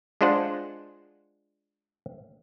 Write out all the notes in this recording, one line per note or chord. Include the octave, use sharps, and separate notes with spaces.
G#3 D4 F4 C5 F#5